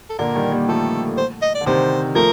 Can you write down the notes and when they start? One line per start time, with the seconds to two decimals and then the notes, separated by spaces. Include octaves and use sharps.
0.10 A4
0.19 A#2 D3 A#4
0.35 D#3 G3
0.51 G3 A#3
0.68 F3 A3 A4
1.18 C5
1.42 D#5
1.55 D5
1.61 D3
1.66 C3 D#3 C5
2.15 F3 A3 A#4